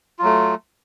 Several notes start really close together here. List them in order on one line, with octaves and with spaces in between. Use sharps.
F4 F#3 A3